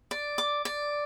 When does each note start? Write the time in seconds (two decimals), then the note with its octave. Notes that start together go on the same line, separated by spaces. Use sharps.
0.11 D5
0.38 D6
0.65 D5